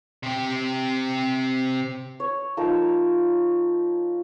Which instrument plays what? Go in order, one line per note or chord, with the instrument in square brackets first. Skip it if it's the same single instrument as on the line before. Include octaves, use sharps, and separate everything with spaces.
[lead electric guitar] C3 G4
[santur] C#5
F3 D#4 A#4 E6